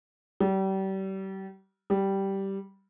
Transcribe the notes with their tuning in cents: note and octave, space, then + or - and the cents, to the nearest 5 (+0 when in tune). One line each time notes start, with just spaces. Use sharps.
G3 -35
G3 -10